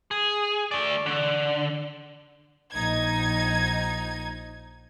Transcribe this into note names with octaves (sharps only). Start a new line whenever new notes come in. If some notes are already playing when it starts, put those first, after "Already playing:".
G#4
A3 D5
D3
A#1 D#4 G#6